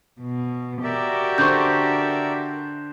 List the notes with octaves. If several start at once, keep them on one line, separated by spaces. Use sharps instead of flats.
B2
F#4 G4 A#4 D5 E5
D3 C5 C#6 G6